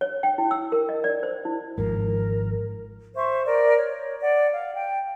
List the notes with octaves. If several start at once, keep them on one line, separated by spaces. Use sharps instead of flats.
C#5
G5
E4
E6
A#4
D#5
D5
C5
E4
G#1 G#2 F3 A#4
C5 E5 C#6
A#4 D5
C#5
D5 F#5
F5
G5